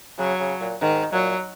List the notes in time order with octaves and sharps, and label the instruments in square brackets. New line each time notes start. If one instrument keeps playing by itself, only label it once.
[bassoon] C#3 [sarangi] F#3
[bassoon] C#3
A#2
[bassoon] G#2 [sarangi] D#3
[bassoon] A#2 [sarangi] F#3